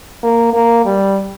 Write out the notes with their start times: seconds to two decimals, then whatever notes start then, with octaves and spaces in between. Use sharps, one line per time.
0.23 A#3
0.53 A#3
0.85 G3